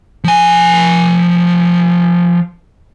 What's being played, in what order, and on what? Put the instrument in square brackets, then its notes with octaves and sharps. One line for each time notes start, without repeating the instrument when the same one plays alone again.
[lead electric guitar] F3 G#5